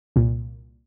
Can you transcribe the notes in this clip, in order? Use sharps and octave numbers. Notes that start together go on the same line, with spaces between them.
C2 A#2